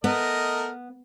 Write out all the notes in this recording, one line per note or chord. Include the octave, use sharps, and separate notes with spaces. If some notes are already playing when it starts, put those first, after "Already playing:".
A3 B3 A#4 D#5